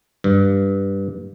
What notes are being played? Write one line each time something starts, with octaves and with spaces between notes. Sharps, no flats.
G2